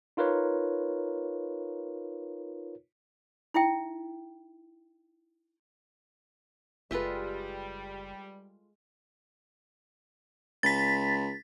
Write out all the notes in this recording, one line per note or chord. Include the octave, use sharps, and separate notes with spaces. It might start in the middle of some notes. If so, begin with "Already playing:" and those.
D#4 F4 A#4 B4 C#5
D#4 E4 E5 G5
F#1 G3 G#3 F4 A4 B4 E5
C#2 A6 B6